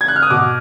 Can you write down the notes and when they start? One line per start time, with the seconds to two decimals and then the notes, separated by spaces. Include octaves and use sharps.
0.01 G#6
0.08 F#6
0.16 F6
0.23 D#6
0.30 B2 D6